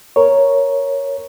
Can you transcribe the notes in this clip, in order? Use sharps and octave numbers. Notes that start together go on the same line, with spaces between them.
A#4 C#5